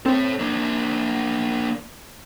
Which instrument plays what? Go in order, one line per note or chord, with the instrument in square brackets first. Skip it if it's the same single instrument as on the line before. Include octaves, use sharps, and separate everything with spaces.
[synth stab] C4 [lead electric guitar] A4 C#5
[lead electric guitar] A#3 D4